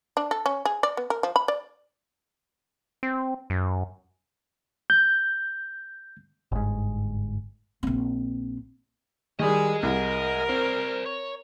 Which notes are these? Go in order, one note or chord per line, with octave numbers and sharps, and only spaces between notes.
D4
A4
C#4
G#4
D5
B3
A#4
F3
B5
D5
C4
F#2
G6
G1 G#2
A#1 C4
D#3 G3 G#4 D#5 G#5
C2 A#4
C4 C5 D5
C#5